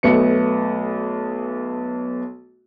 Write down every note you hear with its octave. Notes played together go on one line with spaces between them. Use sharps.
B1 A3 B3 C#7